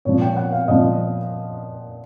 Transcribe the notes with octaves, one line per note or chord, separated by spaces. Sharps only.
A#2 F3 C#5
G5
F#5
F5
A#2 F3 D#5